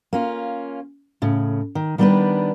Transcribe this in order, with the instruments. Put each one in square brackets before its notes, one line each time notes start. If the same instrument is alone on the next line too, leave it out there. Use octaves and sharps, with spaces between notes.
[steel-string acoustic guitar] A#3 C#4 F4
A2 C#3
D#3
D#3 G3 B3 C#4 D4 B4